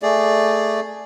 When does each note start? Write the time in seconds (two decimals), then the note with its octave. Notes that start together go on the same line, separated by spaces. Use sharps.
0.03 A3 G#4 D5